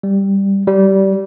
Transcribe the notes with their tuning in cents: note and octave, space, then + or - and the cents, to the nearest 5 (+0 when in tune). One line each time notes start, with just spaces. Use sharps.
G3 +5
G3 -20